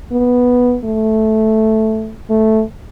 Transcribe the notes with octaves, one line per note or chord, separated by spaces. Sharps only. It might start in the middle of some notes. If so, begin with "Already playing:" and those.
B3
A3
A3